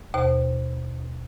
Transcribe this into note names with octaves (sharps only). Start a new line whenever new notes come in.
D#2 B2 C5